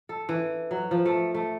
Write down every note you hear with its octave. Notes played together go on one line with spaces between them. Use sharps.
A4
E3
F#3
F3
A3
A3